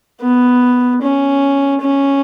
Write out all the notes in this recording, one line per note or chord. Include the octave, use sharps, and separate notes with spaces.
B3
C#4
C#4